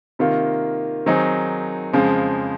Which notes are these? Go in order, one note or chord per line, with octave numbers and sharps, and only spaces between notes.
C3 D#3 A#3 F4
D#3 F#3 C4 D#4 G#4
F2 C#3 F3 G#3